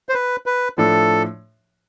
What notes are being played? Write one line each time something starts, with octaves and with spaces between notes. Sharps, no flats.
C5
B4
B4
A2 F3 A3 D4 A4